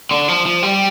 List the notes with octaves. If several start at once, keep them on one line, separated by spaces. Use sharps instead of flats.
D3
F3
F3
G3